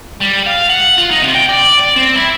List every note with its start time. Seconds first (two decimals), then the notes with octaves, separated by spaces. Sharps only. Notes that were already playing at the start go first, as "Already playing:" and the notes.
0.20 G3
0.46 F5
0.69 F#5
0.98 F4
1.11 D#4
1.22 C3
1.35 G5
1.49 D5
1.79 D5
1.96 C4
2.16 E4